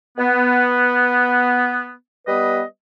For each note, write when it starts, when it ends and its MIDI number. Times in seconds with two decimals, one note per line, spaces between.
0.18 1.92 59
2.27 2.62 55
2.27 2.62 59
2.27 2.62 71
2.27 2.62 75